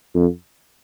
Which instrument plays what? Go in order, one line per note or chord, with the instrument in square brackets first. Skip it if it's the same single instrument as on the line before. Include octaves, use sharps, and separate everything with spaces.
[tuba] F2